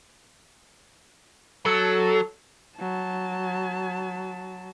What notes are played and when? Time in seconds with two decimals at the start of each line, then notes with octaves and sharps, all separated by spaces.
1.66 F#3 A4
2.79 F#3 A5